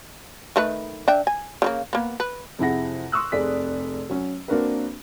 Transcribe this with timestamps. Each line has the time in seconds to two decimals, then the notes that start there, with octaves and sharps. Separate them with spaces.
0.56 D#3 A3 B4
1.08 D4 E5 G5
1.27 G#5
1.62 C#3 G3 A#3
1.93 A#3 B3
2.20 B4
2.59 F2 C3 E4 G#4 F#5 A#6
3.12 C6 C#6 D#6 E6 F#6
3.32 F1 C3 G#4 D5 B6
4.10 F#3 C#4
4.48 A#3 C4 D4 F#4 A#4 B4